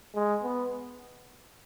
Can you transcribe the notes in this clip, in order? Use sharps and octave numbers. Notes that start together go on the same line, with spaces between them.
G#3
B3